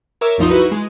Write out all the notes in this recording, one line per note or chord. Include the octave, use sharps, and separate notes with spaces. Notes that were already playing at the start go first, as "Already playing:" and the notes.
A#4 C#5 E5 D6 E6
C2 F#2 F3 D#4 C6
D#4 E4 F#4 B4
G#3